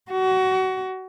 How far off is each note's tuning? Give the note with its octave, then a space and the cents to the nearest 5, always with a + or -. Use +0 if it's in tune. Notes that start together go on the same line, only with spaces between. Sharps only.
F#4 +25